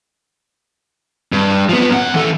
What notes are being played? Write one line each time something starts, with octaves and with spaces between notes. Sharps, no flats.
G2
F3 B3
F#2 F#5
E3 A4